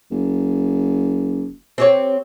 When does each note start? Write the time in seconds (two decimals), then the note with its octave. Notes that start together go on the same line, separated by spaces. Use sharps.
0.11 F#1
1.78 C4 G4 C#5